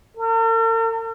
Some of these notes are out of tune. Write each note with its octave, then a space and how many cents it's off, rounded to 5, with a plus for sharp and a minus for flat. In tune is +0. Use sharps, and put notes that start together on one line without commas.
A#4 -45